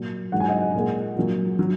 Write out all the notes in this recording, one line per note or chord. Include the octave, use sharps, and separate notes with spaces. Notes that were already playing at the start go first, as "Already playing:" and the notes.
Already playing: A#2 F#3
G#2 F#3 F#5
G#5
D#5 F#5
A#2 G#3
A#2 F#3
F#3